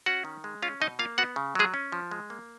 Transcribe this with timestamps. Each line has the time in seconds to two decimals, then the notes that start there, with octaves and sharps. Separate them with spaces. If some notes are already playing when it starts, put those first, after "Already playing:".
0.06 C#4 F#4 F#5
0.25 D#3
0.44 G#3
0.62 C#4 F4 F5
0.80 B2 D#4 D#5
0.99 A#3 F4 F5
1.18 B3 F#4 F#5
1.36 C#3
1.55 F#3 G#3 G#4
1.74 C#4
1.92 F3
2.11 G#3
2.30 A#3